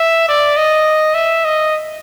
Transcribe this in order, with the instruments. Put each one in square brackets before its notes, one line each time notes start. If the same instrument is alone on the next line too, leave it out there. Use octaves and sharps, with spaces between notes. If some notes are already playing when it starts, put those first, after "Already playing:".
Already playing: [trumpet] E5
D5
D#5
E5
D#5